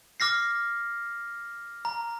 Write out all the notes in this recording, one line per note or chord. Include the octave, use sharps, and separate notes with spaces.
D6 F6 A#6 C7
A#5